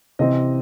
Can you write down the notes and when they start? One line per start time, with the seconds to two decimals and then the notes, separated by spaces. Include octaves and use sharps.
0.19 C3 E3 C4 D#5